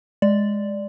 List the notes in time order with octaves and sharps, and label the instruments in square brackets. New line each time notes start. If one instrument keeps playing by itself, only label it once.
[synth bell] G#3 D5